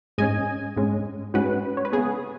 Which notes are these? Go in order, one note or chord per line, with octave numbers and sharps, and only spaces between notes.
G#2 G#3 C#4 D#5 G#5
G#2 G#3 C#4
G#2 G#3 C#4 F#4 B4
C#5
B4
C#3 B3 G#4